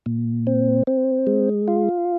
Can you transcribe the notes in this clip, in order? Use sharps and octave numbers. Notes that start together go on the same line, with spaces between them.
A#2
C4
C4
G#3
F4